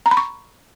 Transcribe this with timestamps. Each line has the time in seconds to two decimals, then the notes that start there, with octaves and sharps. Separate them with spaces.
0.06 A#5
0.11 B5
0.17 C#6